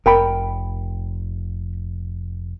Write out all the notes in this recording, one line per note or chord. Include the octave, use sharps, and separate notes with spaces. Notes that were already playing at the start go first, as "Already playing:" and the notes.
F1 A#4 G5 B5